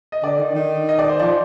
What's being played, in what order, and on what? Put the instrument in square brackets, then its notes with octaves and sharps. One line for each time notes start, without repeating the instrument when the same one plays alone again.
[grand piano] D#5
[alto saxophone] D3 [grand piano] D5
[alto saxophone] D#3
D#3
[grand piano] D#5
D5
C5
[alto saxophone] F3 [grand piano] D5